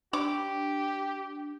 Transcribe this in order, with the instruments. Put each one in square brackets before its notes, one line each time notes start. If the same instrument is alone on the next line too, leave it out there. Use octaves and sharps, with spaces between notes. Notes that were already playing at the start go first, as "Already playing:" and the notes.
[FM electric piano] D4 [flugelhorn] G4 [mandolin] D6